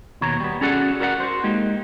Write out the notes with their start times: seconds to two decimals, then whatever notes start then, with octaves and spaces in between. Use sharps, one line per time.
0.21 D#2 B2 C#5 A#5
0.40 G3 B3
0.61 C#4 F#4 G#4 A4 D5 F#5
1.00 F#4 A#4 D5 E5 F#5
1.20 F#4 C5
1.43 G#3 A#3 D#4 G4